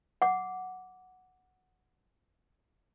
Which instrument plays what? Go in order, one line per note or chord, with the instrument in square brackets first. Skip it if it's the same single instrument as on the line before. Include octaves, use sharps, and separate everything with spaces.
[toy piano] F#5 D6